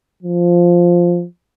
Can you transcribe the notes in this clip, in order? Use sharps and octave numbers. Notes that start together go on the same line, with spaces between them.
F3